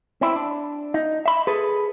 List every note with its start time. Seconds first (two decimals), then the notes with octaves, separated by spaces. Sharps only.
0.21 C4 E4
0.36 D4
0.94 D#4
1.26 E5 B5
1.47 G#4 A4 B4